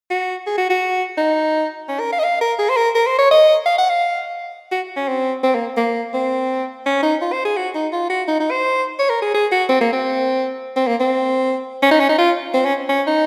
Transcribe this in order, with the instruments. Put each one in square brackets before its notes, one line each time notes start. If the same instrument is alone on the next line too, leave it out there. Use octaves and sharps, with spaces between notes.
[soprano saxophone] F#4
G#4
F#4
F#4
D#4
C#4
A#4
F5
D#5
F5
A#4
G#4
C5
A#4
A#4
C5
C#5
D#5
F5
F#5
F5
F#4
C#4
C4
C4
A#3
A#3
C4
C#4
D#4
F4
C5
G#4
F#4
D#4
F4
F#4
D#4
D#4
C5
C#5
A#4
G#4
G#4
F#4
C4
A#3
C4
C4
A#3
C4
C#4
D#4
C#4
D#4
F4
C4
C#4
C#4
D#4